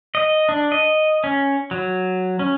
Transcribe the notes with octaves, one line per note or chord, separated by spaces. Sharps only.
D#5
D4
D#5
C#4
F#3
C#4